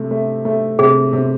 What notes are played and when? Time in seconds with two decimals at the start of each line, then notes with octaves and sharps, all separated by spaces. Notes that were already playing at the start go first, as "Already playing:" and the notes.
Already playing: C3 A3
0.11 A3
0.45 A3
0.79 C3 G#4
1.13 C3